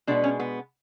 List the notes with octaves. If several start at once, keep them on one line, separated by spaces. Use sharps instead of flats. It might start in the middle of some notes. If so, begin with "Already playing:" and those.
B2 G#3 B3 D4
C#4
B3